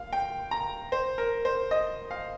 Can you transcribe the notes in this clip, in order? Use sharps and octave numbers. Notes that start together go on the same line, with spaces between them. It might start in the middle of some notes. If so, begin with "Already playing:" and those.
Already playing: F5
G5
A#5
C5
A#4
C5
D#5
F5